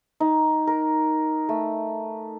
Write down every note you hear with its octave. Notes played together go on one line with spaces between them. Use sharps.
D#4
A#4
A3